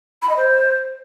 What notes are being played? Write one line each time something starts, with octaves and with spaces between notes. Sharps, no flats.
B5
D#5
C5